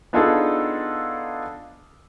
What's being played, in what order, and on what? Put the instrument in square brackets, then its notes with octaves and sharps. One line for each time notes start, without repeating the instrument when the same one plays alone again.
[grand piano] B3 D4 D#4 F4 G#4 A4